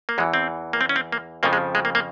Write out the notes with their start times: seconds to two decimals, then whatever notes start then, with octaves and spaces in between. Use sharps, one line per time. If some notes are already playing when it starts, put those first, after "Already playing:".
0.09 A#3
0.18 E2 E3 G#3
0.34 C4
0.73 A#3
0.81 C4
0.89 C#4
0.96 C4
1.12 A#3
1.43 F2 C#3 F3 A#3
1.53 G#3
1.75 G#3
1.85 A#3
1.95 A#3